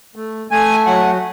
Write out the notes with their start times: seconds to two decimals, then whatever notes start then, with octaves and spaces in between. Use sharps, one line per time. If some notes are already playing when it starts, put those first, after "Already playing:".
0.16 A3
0.51 A3 G#5
0.86 F#3 F#5